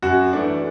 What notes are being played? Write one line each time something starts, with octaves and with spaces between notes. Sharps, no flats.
F#2 F#4
E3 A3 D4